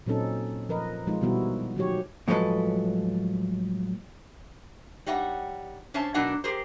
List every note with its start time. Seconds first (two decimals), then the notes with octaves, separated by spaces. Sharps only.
0.06 A#2 F#3 C4 C#4 D#4 A4
0.69 F3 A#4 B4 D#5
1.07 F3 G#3 D#4 F4
1.21 B2 D#3 G3 B3 E4 F#4
1.76 D#3 F3 F#3 G4 C#5
2.28 A2 F3 F#3 G#3 A4 B4
5.06 G3 D#4 C#5 E5 F#5
5.94 C#4 C5 C#5 E5 A5
6.14 B2 F#3 D4 D#4 A#4 F#5
6.44 G4 G#4 A#4 C5